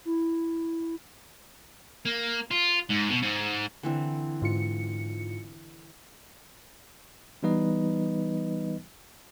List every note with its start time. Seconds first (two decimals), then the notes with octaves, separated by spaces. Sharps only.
0.05 E4
2.05 A#3
2.51 F4
2.90 G#2
3.11 B2
3.23 G#2
3.83 D3 E3 C4
4.42 G#2 F4 C#7
7.43 E3 G3 B3 D#4 B4 D#5